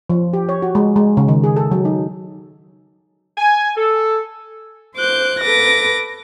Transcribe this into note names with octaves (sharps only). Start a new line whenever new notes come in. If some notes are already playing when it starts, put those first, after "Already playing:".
F3
G4
C#5
F#4
G#3
G#3
C#3
D#3
G#4
A4
F#3
D#4
G#5
A4
C5 D6 F#6 G6
A4 B4 D6 A#6